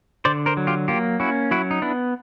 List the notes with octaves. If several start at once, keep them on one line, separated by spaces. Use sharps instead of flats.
D3 C5 D5
A#4 C5
F#3
F4 G4
A#3 F4 G4
C#4 E4 F#4
F#3 E4 F#4
D#4
B3 D4 E4